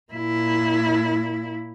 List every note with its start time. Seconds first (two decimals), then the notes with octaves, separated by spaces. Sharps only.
0.13 A#2 E4